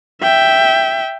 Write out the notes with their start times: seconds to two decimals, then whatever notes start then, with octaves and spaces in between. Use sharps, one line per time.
0.22 E5 G5